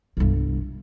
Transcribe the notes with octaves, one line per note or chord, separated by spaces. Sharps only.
G1 C2